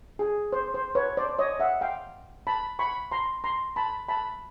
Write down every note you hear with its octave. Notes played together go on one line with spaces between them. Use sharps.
G#4
C5
C5
B4 C#5
C5 D5
C#5 D#5
E5 F#5
F5 G5
A5 B5
B5 C#6
A#5 C6
A#5 C6
A5 B5
A5 B5